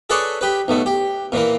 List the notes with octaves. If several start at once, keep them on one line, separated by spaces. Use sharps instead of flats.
G#4 A4 B4 C#5 D5 G#5
G4 B4
B1 B2 A3
G4
A#2 E3 A#3